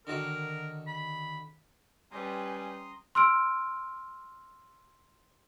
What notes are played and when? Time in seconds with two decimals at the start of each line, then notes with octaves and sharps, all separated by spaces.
0.07 D3 D#3 F#4 A#4
0.87 B5
2.12 G3 C#4 B4 G#5 A#5 C6 D#6
3.15 C6 E6 F6 D7